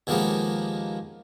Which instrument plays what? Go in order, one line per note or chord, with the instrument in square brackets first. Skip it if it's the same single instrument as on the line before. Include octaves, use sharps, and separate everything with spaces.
[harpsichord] D#2 D#3 F3 G#3 A#3 B3